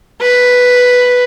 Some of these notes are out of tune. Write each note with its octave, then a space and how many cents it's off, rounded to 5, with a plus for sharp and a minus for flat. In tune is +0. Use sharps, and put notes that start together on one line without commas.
B4 +0